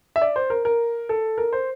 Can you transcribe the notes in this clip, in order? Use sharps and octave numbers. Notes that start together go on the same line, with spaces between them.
E5
D5
C5
A#4
A#4
A4
A#4
C5